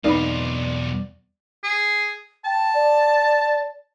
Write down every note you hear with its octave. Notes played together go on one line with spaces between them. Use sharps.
B1 E2 B3 C4 D#4 F4 B4 D5
G#4
G5 A5
D5